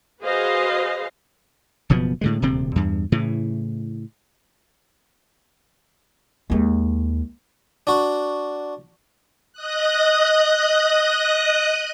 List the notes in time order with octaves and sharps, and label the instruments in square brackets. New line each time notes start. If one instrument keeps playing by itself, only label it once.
[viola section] F#4 G#4 B4 C5 D#5 F5
[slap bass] F#1 B2 F3 B3
A2 D3 G#3
D#1 D2 C3 C4
E2 G2
A2 C#3 E3
[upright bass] D#2 G#3
[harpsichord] D4 F#4
[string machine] D#5 D#6 F#6